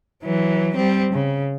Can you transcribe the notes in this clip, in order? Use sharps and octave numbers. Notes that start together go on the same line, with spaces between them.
E3 F#3
G3 C4
C#3